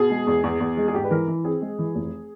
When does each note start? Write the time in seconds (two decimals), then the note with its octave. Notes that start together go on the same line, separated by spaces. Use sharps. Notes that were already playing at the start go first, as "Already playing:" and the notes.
Already playing: B2 G#4
0.10 G#3
0.27 E2
0.44 E2
0.60 E2
0.77 G#3
0.88 G#4
0.94 G#2 G4
1.04 B4
1.11 E3 A#4
1.28 E3
1.44 C4 G#4
1.61 G#3
1.79 E3
1.95 F1